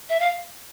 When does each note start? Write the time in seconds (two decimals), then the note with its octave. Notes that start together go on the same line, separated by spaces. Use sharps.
0.09 E5
0.19 F5